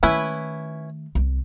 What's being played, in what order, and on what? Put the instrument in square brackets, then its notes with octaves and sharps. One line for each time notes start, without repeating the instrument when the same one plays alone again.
[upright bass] D#3 A3 [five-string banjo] C#4 E4 B4
[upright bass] C2